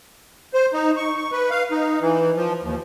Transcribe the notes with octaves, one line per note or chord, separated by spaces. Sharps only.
C5
D#4
C#6
C#6
B4
F5
D#4
E3
F3
D#2